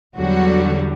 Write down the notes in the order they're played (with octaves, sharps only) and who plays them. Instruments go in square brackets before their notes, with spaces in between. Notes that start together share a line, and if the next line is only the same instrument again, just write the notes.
[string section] E2 D3 F#3 G3 F#4